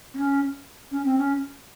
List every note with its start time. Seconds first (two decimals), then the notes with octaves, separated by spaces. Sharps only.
0.14 C4
0.18 C#4
0.91 C#4
1.05 C4
1.18 C#4